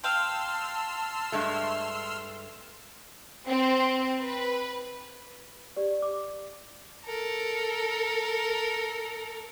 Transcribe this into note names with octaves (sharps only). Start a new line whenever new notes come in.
F5 G5 A5 C6 E6 F6
G2 G#3 A3
C4
B4
G4 D5
D6
A4 A#4